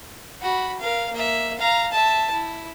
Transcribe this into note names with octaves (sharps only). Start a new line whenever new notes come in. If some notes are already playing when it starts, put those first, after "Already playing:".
F#4 B5
A#4 F5
A#3 E5
F5 A#5
E5 A5
E4